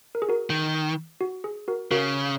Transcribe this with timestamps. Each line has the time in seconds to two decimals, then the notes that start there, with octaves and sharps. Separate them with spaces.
0.15 A#4
0.22 G#4
0.29 F#4 A#4
0.50 D#3
1.21 F#4
1.44 G#4
1.68 F#4 A#4
1.91 C#3 F#4 A#4